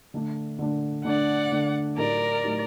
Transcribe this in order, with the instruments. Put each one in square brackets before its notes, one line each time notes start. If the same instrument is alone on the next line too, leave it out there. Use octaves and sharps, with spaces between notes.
[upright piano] D3 A3 D4
D3 A3 D4
[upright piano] D3 A3 D4 [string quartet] D5 F#5
[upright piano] D3 A3 D4
[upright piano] A2 F#3 A3 D#4 G4 [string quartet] A#4 D5
[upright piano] A2 F#3 A3 D#4 G4